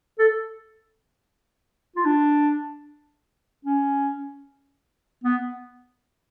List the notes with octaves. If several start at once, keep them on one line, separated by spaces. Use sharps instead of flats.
A4
F4
D4
C#4
B3